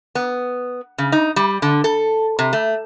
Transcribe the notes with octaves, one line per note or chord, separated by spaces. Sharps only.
B3
C#3
D#4
G3
D3
A4
C3
A3